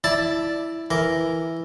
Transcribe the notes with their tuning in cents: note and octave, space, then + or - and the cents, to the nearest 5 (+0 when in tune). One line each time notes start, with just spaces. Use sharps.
E4 +0 D5 +0 A5 +0
E3 +0 A#4 +0